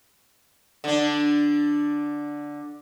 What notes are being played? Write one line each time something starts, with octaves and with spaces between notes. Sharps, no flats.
D3 D4